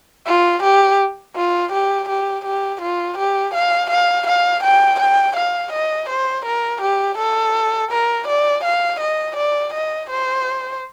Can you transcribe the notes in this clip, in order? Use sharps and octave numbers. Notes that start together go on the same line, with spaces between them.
F4
G4
F4
G4
G4
G4
F4
G4
F5
F5
F5
G5
G5
F5
D#5
C5
A#4
G4
A4
A#4
D5
F5
D#5
D5
D#5
C5